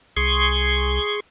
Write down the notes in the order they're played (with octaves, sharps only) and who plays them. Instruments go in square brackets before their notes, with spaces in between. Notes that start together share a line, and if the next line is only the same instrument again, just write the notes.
[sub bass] C2 [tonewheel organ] G#4 C6 C#6